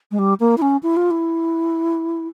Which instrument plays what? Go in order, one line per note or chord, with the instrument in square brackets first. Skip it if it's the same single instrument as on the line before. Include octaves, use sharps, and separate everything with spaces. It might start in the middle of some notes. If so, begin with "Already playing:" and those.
[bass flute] G#3
G3
A#3
E4
C#4
E4
F4
E4